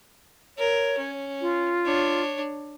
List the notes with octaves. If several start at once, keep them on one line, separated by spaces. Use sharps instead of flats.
A#4 C#5
C#4
F4
D4 C#5